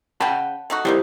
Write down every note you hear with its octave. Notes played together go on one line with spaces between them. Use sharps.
C#3 F#5 G5 A5 B5
A3 D#4 F#4
G3 A#3 D#4 E4 G4 C5